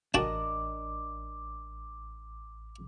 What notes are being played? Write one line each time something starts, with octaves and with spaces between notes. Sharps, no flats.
A1 D4 F#4 A#4 D#5 G5 A5 D6